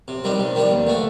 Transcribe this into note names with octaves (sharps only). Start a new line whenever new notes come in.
C3
D#3 G3 D4
C3
D#3 G3 D4
D#2
D3 A3 D4